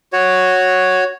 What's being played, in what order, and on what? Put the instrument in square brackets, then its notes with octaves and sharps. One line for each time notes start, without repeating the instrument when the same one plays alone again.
[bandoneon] F#4 C#5